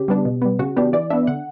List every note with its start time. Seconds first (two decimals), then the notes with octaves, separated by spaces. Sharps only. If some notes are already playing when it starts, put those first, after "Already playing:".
Already playing: C#3 G4
0.08 G3 B3 D4
0.25 B2
0.42 G3 B3
0.59 C#3 F#4
0.76 E3 B3 D4 G4
0.93 E3 D5
1.10 B3 D4 E5
1.27 D3 F#5